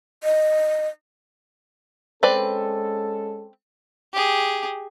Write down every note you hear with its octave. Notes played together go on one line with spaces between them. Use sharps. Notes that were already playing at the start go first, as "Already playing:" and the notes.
D#5
G#3 C4 C#4 A4 B4 D5
G4 G#4